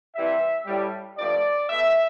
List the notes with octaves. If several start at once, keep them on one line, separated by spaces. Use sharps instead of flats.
C3 E3 G3 E5
A2 G3
G2 F3 A3 D5
B2 A3 E5